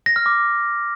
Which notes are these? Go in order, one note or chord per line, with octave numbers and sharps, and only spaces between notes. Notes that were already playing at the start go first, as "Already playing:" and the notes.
A#6
F6
D6